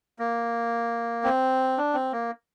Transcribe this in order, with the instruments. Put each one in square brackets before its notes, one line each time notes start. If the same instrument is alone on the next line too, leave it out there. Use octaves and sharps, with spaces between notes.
[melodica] A#3
C4
D4
C4
A#3